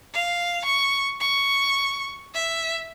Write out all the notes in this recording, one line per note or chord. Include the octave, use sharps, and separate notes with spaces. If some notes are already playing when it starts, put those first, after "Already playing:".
F5
C#6
C#6
E5